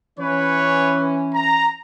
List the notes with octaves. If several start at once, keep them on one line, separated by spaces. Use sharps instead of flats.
E3 C#4 B4 C#5
A#5